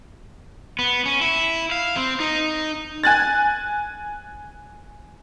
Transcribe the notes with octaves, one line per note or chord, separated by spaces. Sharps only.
B3
C#4
E4
F5
C4
D#4
G#5 F#6 A6